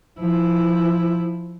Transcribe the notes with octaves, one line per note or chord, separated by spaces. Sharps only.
F3 E4